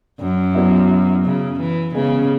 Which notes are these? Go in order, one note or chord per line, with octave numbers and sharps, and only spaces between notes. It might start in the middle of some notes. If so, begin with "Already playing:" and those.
F#2
F#3 B3 E4
C#3
E3
C#3 G#3 B3 G#4